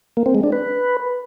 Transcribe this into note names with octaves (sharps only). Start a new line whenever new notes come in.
A#3
C4
G#3
D4
B4